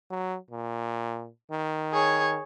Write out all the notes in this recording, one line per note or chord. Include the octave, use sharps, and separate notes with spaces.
F#3
A#2
D#3
G#4 C#5